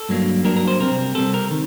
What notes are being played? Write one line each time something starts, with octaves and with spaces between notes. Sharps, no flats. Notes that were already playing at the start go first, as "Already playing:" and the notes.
Already playing: A4
G2 F#3 A#3 D4
G2 F#3 A#3 D4 A#4
A#4
C5
C3 G3 C4 A#4
C3 G3 C4 A4
A#4
D#3